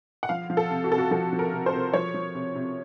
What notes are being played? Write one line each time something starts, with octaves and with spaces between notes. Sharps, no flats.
F#5
F3 F5
F3
A4
C3
F#4
C3 A4
F#4
F3 A4
F3
A#4
C3
C5
C3
F3 C#5
F3
C3
C3